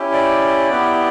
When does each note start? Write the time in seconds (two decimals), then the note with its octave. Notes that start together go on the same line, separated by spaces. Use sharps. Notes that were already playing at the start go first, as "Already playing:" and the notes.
Already playing: C#4 E4 G4
0.13 D5
0.70 B3 E4 G4